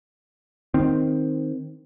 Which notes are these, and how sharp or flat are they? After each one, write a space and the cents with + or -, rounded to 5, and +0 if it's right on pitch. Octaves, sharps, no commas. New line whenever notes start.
D#3 +0 C4 +0